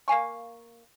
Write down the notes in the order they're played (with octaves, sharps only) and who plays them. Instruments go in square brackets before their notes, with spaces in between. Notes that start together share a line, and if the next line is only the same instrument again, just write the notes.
[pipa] A#3 F5 G#5 C#6